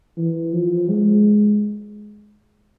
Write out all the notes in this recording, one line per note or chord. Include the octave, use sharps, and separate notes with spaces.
E3
F3
G#3